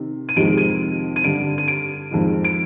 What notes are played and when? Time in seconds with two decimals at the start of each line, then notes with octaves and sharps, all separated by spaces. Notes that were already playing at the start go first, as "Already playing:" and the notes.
Already playing: C3 D#3
0.29 D#7
0.36 F2 C3 D#3 G#3 D7
0.58 D#7
1.16 D#7
1.24 G2 D3 G3 D7
1.58 D#7
1.68 D7
2.11 F2 D#3 G#3
2.45 D7